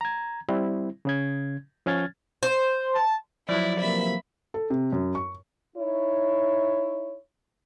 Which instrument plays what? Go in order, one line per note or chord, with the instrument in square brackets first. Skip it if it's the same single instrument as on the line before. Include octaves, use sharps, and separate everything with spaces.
[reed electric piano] A#5 G#6
G3 C4 E4
C#3 C#4 G#6
F3 C#4 F6 G#6 A6
[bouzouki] C5
[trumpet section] A5
[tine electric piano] F3 F#3 [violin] E4 [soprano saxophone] D5
[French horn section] C3 E3 A#3 [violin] E5 B5
[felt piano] A4
C3
F#2
C#6
[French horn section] D#4 E4 C#5